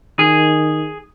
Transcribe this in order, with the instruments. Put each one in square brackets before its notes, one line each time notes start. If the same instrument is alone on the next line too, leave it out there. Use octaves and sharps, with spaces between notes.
[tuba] D#3 [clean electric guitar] G#4